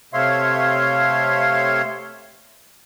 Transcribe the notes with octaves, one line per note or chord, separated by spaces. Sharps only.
C3 A3 C#5 E5 F5 C6